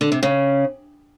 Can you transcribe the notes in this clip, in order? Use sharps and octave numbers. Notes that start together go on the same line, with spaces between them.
D3
C3
C#3